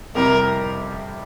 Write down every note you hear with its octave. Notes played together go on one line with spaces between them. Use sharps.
F2 C3 G3 C4 E4 A#4